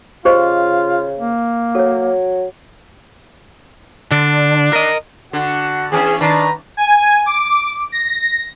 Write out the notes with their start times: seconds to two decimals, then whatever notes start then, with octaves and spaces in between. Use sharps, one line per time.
0.25 C#3 F4 G4 C5 D#5
1.19 A#3
1.75 F#3 A4 C#5
4.11 D3 D4
4.73 A#4 D#5
5.33 D3 F#4 F#5
5.92 E2 C#4 G#4
6.21 D#3 D4 B4 A#5
6.77 G#5
7.26 D6
7.92 A#6